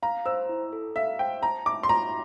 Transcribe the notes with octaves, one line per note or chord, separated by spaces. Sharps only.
F5 A#5
C5 E6
E4
A4
E5 F5
C5 G5
A5 A#5
E5 D6
C6
F4 A#5